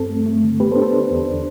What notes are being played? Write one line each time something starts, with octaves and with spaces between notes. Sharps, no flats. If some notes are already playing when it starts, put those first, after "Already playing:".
Already playing: G2 C4 A4
A3
A3
D3
B3 G4 B4
A4 C5
D4
A4 C5
D4
E2
D4